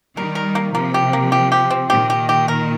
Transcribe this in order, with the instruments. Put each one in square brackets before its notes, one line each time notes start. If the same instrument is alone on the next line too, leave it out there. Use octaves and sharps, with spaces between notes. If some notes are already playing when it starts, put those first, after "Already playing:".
[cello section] D#3 G3 [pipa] A#4
[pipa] A#4
A#3
[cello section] C3 F3 [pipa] A#3
[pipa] G4
A#3
G4
G4
C4
[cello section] A#2 D#3 [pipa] G4
[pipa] G4
G4
A#4